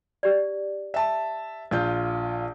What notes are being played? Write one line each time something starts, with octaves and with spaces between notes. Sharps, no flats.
G4 D5
E5 A5
A#1 F4 G6